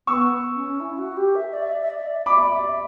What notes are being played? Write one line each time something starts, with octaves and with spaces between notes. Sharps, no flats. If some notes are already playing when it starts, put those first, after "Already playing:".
B3 C#6 E6
C#4
E4
F#4
G4
E5
D5
E5
D5
E5
D5
E5
D5
E5
D5 B5 D6
E5
D5
E5
D5
E5